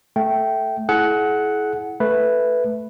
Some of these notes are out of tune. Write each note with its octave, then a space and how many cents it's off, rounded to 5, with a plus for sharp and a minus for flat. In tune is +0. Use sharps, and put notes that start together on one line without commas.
A3 +0 G5 -15
E4 +0 G#4 +40 F#5 +0
A3 +0 B4 +0